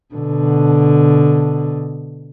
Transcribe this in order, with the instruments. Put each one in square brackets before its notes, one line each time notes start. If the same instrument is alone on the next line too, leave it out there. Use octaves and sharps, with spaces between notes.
[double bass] B2 D3